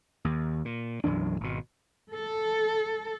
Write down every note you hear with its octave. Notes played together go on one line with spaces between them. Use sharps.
D#2
A#2
B1 F#2 E3 D4
G#1 B2
A4